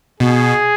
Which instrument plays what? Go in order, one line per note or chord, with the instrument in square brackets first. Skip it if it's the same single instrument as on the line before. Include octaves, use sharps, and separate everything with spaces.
[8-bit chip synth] B2 [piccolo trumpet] G#4